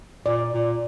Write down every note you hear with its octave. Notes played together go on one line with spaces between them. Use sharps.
A#2 D5
A#2